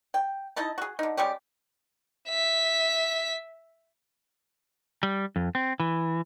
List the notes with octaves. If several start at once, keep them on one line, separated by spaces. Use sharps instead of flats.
G5
D#4 E4 D#5 A5
F#4 G#4
D3 D#4
G3 G#3 C#4 G4
E5 B6
G3
F2
C4
E3